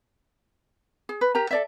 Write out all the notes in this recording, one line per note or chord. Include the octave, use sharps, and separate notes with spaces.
G#4
B4
G4 A#4 A#5
A4 D5 E5